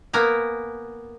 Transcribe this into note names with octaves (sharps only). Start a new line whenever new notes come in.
A#3 B3 A#4 G#5